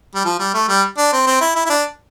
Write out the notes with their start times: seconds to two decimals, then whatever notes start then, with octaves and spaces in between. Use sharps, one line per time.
0.15 G3
0.25 F3
0.39 G3
0.54 A3
0.68 G3
0.97 D4
1.12 C4
1.26 C4
1.41 E4
1.55 E4
1.65 E4
1.70 D4